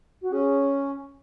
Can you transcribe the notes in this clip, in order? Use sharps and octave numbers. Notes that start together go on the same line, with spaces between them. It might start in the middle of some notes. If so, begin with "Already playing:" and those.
F#4
C#4 G#4